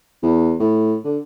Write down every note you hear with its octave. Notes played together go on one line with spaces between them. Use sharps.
E2
A2
D3